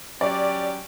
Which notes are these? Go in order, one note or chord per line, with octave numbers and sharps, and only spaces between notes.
F#3 C#4 G4 D5